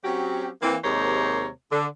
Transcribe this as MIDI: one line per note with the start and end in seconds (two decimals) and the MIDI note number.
0.04 0.49 54
0.04 0.49 60
0.04 0.49 61
0.04 0.49 66
0.04 0.49 67
0.62 0.77 52
0.62 0.77 58
0.62 0.77 60
0.84 1.49 39
0.84 1.49 48
0.84 1.49 56
0.84 1.49 70
0.84 1.49 72
0.84 1.49 73
1.72 1.86 50